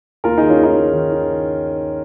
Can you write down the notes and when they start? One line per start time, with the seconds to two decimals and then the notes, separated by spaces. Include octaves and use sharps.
0.24 D#2 F4 A#4
0.38 D#3 D#4 G#4
0.50 C#4 F4
0.59 D#3 D#4
0.76 D#2
0.93 D#3
1.11 D#3